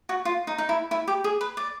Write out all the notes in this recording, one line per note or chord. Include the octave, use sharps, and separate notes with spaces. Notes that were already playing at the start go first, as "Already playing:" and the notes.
F#4
F4
D#4
D#4
E4
E4
G4
G#4
B4
D5